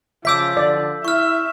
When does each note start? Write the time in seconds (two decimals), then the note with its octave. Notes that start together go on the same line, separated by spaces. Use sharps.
0.25 C#3 F3 E5 D6 E6 G6 B6
0.57 D3 D5
1.05 E4 E5 C#6 F6